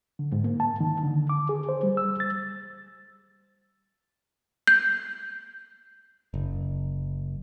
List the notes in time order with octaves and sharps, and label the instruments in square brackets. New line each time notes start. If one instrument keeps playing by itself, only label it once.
[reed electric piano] D3
G#2
A#3
A5
D#3
D3
D6
G#4
C5
G3
E6
A6
[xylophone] G6
[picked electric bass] F#1